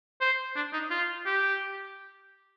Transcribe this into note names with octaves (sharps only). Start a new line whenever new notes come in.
C5
D4
D#4
F4
G4